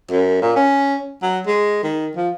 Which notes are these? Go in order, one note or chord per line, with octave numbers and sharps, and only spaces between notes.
F#2
A#2
C#4
F#3
G#3
D#3
F3